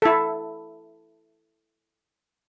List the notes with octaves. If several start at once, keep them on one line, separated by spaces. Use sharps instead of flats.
E4 A4